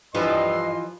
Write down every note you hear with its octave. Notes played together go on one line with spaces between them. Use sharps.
G2 E3 F3 D#5 C6